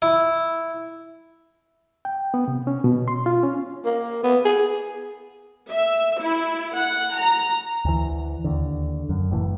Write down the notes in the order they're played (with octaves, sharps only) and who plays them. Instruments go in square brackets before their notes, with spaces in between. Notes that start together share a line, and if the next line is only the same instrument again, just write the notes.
[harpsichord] E4
[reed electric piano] G5
B3
C3
C#4
B2
C6
F4
C#4
[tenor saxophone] A#3
B3
G#4
[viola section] E5
E4
F#5
A#5
[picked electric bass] D2 E3
D#2 D3
F#2
F#1 A2 E3